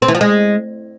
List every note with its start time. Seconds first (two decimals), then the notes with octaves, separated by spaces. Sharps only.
0.02 C4
0.08 E3
0.15 F3
0.21 G#3